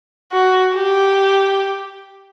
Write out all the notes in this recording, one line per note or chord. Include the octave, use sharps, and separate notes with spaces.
F#4
G4